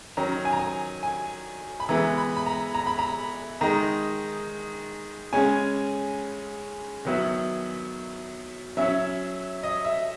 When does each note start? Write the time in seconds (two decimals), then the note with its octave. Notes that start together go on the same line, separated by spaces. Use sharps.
0.17 D#3 F#3 C#4 A#5
0.45 G#5
0.53 A#5
0.59 G#5
1.03 G#5
1.80 B5
1.89 E3 G#3 B3 E4 A#5
2.18 B5
2.36 B5
2.46 A#5
2.75 A#5
2.87 B5
2.99 A#5
3.61 D#3 G#3 D#4 A#5
5.33 C#3 G#3 C#4 G#5
7.05 D#3 F#3 B3 E4
8.77 F#3 C#4 E4 E5
9.63 D#5
9.85 E5